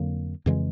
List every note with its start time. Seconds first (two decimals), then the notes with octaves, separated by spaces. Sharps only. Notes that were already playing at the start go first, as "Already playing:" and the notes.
Already playing: F2 D3 F#3 A#3
0.46 F2 C#3 E3 G#3